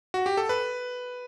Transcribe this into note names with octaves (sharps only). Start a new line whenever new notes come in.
F#4
G4
A4
B4